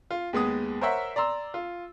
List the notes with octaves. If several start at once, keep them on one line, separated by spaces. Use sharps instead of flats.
F4
D#2 G#3 B3 D#6
A#4 C5 C#5 E5 F#5
D5 A#5 C6 E6
F4